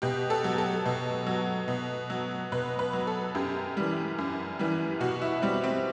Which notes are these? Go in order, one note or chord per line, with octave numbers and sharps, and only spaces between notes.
B2 G4
A4
F#3
A4
B2
F#3
B2
F#3
B2 B4
B4
F#3
A4
F#2 G4
E3 G3
F#2
E3 G3
B2 F#4
E4
G3 C4
C4